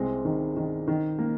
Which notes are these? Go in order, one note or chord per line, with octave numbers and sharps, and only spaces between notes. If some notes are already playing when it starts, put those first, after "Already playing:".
Already playing: C2 G#3 C4
D#3
D#3
D#3
A#3